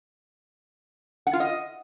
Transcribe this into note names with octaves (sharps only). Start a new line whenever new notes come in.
F#5
F4
D#5